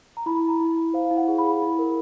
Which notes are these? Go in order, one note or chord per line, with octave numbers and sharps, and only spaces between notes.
A#5
E4 B5
E4
A#5
E4
E4
C5 F5
E4
F#5
G#4
B5
G#4
E4
A#4